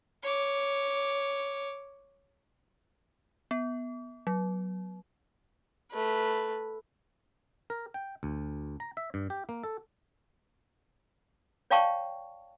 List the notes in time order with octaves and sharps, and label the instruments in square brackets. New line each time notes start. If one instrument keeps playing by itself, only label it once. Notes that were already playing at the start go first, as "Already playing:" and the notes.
[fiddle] C#5 D6
[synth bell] B3
F#3
[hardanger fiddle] A3 B4
[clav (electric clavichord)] A#4
G5
D2
A#5
E5
G2
G4
A#3
A4
[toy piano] C#5 D5 F5 G5 A5 C#6